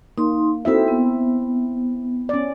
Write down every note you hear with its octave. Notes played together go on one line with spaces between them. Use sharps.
A#3 D#4 C6
C4 D#4 E4 F#4 A4 E5
B3
C#4 D5